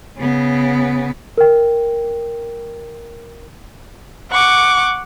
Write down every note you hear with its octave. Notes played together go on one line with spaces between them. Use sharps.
C#3 B3
A#4 G5
F#5 C#6 D6